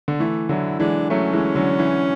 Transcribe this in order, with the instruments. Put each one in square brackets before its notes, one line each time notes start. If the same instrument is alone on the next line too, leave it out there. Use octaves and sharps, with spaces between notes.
[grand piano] D3
[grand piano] E3 [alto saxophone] A3
[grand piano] D3 F#3 [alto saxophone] E4
[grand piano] E3 G#3 [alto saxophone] D4
[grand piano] F#3 A3 [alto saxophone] C#4
[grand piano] E3 G#3
D3 F#3
E3